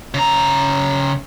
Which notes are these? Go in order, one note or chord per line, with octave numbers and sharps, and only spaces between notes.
C#3 A#5